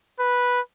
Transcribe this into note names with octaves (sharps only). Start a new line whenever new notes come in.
B4